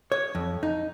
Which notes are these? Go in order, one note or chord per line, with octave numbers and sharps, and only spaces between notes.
C#5
F2
D#4